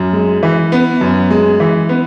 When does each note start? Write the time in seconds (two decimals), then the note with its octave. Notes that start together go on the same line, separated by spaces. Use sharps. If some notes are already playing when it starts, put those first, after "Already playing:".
Already playing: F#2
0.13 G#3
0.43 E3
0.72 B3
1.01 F#2
1.31 G#3
1.60 E3
1.89 B3